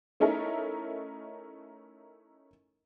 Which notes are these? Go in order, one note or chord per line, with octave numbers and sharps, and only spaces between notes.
A3 C#4 D#4 E4 A4 A#4